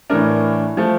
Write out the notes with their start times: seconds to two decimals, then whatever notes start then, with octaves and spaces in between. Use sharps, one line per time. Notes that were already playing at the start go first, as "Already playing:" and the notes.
0.10 A2 E3 A3 D4 A#4
0.77 F3 A3